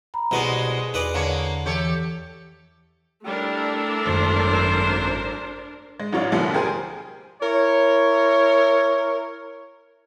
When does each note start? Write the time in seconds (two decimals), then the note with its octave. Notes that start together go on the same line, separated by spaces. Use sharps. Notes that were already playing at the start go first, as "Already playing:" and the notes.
0.14 A#5 B5
0.31 C2 B2 G#3 B3 D#5
0.94 E2 D#4 B4 D5
1.15 D3 A#3 C#5
1.66 E3 G4 A4 C#5
3.26 G3 A3 D4 E4 A#4
4.06 G#1 F#2 C5
6.00 G#3
6.12 A1 F#3 C#5 D5 F5
6.32 G#1 D2 B2 F3 G3
6.54 G4 G#4 A#4 C5 G#5
7.40 E4 A#4 C#5